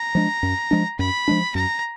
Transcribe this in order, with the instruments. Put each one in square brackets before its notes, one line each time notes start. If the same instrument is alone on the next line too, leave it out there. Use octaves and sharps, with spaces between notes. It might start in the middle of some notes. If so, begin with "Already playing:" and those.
Already playing: [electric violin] A#5
[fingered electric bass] F3 G#3 D4
F#2
F3 G#3 D4
[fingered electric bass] F#2 [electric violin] B5
[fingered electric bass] F3 G#3 D4
[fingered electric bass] F#2 [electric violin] A#5